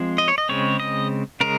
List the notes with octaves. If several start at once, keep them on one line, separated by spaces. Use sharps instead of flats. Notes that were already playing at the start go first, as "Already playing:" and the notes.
Already playing: F3 G#3 C4
D#5
C#5
D#5
C#3 G#3 C4 C#5
D#5
C#3 G#3 A#4